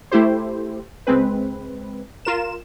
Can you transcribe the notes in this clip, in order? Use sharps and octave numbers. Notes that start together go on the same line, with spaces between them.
A3 E4 G4 C5
C#2 G#3 C4 B4
F4 A#4 E7